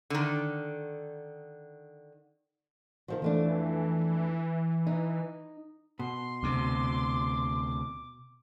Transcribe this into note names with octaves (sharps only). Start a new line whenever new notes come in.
D3 D#3
D#3 F3 F#3
F2 E3 A3 D4
D#4
B2 C6
D2 C3 D6